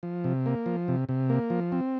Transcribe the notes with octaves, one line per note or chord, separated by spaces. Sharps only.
F3
C3
A#3
F3
C3
C3
A#3
F3
C4